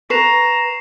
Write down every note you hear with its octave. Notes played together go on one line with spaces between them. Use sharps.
B4 A#5 C#6 C7 E7